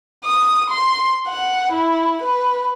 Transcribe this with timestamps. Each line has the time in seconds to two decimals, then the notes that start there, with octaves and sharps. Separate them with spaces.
0.25 D#6
0.70 C6
1.28 F#5
1.72 E4
2.22 B4